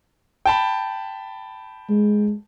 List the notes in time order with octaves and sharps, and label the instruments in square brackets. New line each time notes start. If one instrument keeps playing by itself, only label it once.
[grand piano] G5 A5 B5
[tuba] G#3